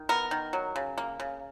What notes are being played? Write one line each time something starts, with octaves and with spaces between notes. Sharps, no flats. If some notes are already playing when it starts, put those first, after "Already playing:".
Already playing: D#3
B3 A#4
D#3
F#3
C#3
A#3
C#3